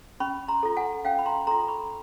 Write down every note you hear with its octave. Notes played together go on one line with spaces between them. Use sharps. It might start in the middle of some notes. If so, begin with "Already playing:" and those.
C#4 B5 C#6
A#5 C6
F4 A4
F#5 G#5
C#4 F5 G5
B5
A#5 C6
F4 A4 A#5 C6
B5 C#6